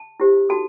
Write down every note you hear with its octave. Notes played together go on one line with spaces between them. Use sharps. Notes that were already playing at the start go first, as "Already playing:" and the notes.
Already playing: A5
E4 G4 C5
D#4 F#4 A4 A5